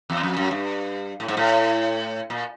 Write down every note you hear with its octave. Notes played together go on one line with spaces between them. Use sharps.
E2
F2
F#2
G2
A2
G#2
A2
A#2